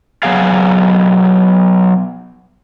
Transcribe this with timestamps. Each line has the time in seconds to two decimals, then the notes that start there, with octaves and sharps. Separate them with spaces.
0.23 F#3 B3 G#4 F5